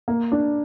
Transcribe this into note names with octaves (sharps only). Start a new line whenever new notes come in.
A#3
D4